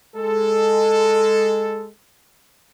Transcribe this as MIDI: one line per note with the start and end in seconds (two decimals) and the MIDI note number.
0.16 1.88 56
0.16 1.88 69